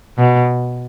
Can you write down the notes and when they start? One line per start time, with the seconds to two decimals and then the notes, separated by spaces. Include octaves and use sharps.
0.18 B2